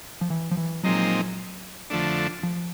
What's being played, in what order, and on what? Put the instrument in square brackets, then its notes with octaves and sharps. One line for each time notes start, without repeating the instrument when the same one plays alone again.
[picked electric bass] F3
E3
F3
E3
[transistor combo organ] A#2 F3 G#3 C4 D#4 [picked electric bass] F#3
[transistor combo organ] F2 D3 F3 A3 D4
[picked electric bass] F3